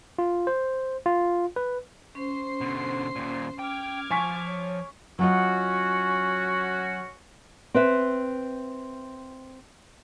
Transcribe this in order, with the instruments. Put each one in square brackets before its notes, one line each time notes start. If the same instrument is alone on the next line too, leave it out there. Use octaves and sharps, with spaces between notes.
[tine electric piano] F4
C5
F4
B4
[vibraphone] C#4 [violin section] C5 C7
[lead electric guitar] B2 D3
D#2 A#2
[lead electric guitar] G5 [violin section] D6 F6 G#6
[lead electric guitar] F3 [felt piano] G#5 C#6 B6
[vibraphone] C#5
[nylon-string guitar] F#3 F4 D#5 [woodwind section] C#4 F#4
[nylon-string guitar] C4 B4 E5